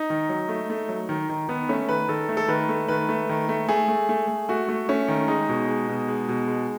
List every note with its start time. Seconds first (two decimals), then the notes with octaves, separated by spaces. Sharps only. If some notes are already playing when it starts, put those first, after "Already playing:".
Already playing: D#4
0.10 D#3
0.29 F#3
0.49 A3
0.70 A3
0.89 F#3
1.09 D#3
1.29 D#3
1.48 D#3 B3
1.69 A3 C#4
1.89 D#3 B4
2.09 D#3 A4
2.29 A3
2.37 A4
2.48 D#3 B4
2.69 A3
2.88 D#3 B4
3.09 A3
3.29 D#3
3.49 A3
3.68 A3 G#4
3.88 A3
4.09 A3
4.28 A3
4.49 A3 F#4
4.69 A3
4.89 A3 C#4
5.08 D#3
5.28 G#3 D#4
5.49 B2
5.68 G#3
5.89 B2
6.08 G#3
6.28 B2
6.48 G#3